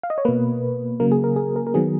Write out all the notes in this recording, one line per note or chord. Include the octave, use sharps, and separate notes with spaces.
F5
D#5
C#5
B2 A#3 B4
C#3 F#3 A#3 A#4
G#4
A#4
G#4
A#4
A#4
D#3 F#3 B3 G#4